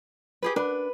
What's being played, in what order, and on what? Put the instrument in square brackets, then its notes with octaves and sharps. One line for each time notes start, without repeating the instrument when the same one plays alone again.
[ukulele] G4 G#4 B4
[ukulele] D4 [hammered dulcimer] B4